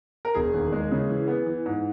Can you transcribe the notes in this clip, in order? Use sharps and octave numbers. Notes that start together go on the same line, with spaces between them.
A#4
E1 G#4
D#2
G#3
C#3
E3
B3
E3
G#2